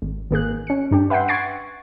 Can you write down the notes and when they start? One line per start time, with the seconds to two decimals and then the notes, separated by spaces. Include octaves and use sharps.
0.02 G#1
0.31 G#1 A#3 G#4 F#6
0.67 C#4 C#7
0.91 G2 D4 G4
1.10 B4 E5 F#5 G5 C6
1.28 F#5 C#6 G#6 A6 C7 D7